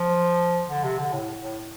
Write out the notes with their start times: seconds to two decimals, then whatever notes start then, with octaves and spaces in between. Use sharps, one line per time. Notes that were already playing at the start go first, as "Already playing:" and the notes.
Already playing: F3
0.69 D3
0.84 C3
0.98 D3
1.13 A2
1.43 A2